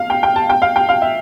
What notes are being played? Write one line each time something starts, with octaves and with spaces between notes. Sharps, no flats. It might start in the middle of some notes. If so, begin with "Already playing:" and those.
Already playing: F5
G5
G5
A5
G5
F5
G5
F5
E5